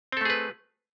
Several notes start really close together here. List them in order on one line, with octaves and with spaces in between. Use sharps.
C4 A4 A3 G#4 B4